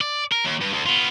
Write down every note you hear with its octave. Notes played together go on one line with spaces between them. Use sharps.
D5
A#4
D#2
G2
D2
B3 F4